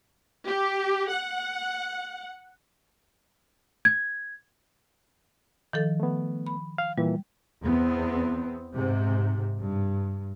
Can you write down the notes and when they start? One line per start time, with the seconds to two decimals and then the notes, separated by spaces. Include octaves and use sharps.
0.47 G4
1.11 F#5
3.85 G#6
5.73 D#3 F3 A4
6.00 A3 B3
6.46 B5
6.78 F5
6.98 A#2 E3 G3
7.62 E2 B3 C4
8.74 G#2 C3
9.60 G2